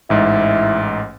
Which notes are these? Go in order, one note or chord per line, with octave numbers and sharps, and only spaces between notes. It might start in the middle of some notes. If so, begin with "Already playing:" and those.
A1 G#2 E4